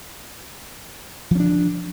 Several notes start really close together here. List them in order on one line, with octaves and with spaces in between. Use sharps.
F3 C#4 D4